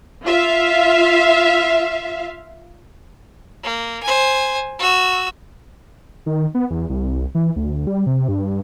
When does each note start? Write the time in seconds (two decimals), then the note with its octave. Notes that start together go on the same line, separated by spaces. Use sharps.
0.24 F4 E5 F5
3.64 A#3
4.03 C5 G#5
4.79 F#4 E6
6.26 D#3
6.55 B3
6.70 E2
6.90 C2
7.35 E3
7.56 D2
7.87 G3
8.07 C3
8.28 G2